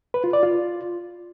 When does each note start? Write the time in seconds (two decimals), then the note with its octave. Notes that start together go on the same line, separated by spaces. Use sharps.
0.14 B4
0.24 F4
0.33 D5
0.43 F4